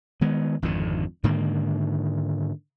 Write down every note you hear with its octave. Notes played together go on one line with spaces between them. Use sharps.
D#3 G#3 B3
G#1 F2 G#2 D3
G#2 D3 D#3 A#3